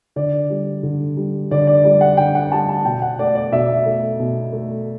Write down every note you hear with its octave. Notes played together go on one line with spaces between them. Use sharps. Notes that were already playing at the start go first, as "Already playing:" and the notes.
D3 D5
G3
D3
G3
D3 D5
D5
G3 D5
F#5
D3 G5
F#5
G3 A5
A5
B2 G5
F#5
A3 D5
D5
B2 E5
A3
B2
A3